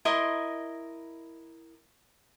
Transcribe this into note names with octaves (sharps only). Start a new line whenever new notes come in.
E4 A#4 D#5 C6